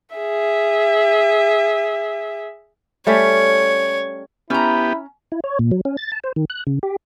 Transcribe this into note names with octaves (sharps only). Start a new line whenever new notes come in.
G#4 E5
G3 A3 C#4 C#5
B3 C#4 E4 G4 A#5
E4
C#5
A#2
F#3
C#4
A6
A5
C5
D#3
F#6
C#3
G4